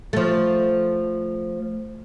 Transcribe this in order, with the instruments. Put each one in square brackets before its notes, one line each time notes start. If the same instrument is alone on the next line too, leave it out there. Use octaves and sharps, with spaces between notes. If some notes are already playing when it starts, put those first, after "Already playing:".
[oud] F3 A3